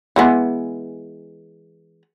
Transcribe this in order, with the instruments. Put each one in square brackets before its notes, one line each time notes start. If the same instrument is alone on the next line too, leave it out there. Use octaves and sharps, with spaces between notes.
[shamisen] E3 G#3 B3